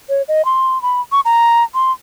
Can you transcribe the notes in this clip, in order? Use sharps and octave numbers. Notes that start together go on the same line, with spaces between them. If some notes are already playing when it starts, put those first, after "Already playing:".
C#5
D#5
C6
B5
C#6
A#5
C6